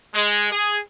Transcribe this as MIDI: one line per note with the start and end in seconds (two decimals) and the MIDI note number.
0.14 0.50 56
0.52 0.78 68